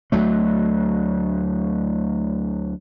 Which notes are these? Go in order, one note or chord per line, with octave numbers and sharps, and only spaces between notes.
D2 F#3 A3